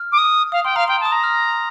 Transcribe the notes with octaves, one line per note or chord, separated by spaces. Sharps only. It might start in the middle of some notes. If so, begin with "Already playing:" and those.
Already playing: F6
D6
D#6
F5 D#6
G5 C6
F5 A#5
G5 C6
A5
D#6
A#5
F6